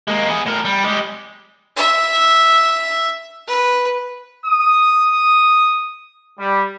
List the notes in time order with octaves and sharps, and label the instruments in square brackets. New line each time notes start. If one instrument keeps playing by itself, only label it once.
[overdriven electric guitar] G#3 A#3
B3 G#4
A2 A#4
G3
G#3 G4
[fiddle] E5
B4
[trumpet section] D#6
G3